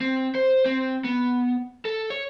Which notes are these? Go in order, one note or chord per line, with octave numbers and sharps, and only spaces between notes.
C4
C5
C4
B3
A4
C#5